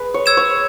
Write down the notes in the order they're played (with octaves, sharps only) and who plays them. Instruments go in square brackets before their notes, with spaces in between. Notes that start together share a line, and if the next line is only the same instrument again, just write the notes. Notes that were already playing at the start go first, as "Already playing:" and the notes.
Already playing: [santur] G#4 B4
C#5
[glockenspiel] E6 G#6 E7
[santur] C#5